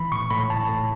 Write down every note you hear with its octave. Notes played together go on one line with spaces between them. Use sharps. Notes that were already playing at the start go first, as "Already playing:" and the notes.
Already playing: E3 B5
A2 C#6
A2 B5
A2 A5
A2